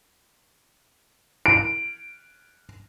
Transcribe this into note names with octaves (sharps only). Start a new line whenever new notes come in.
D7